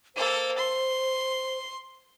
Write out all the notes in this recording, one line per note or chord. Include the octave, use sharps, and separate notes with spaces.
A#3 A4 C5
C6